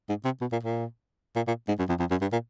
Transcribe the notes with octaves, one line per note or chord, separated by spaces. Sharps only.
G#2
C3
B2
A#2
A#2
A#2
A#2
G#2
F#2
F2
F2
F#2
G2
A#2